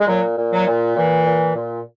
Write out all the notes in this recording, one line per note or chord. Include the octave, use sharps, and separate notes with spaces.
G#3
A#2 F#3
A#2
F#3
A#2
A#2 E3
A#2
A#2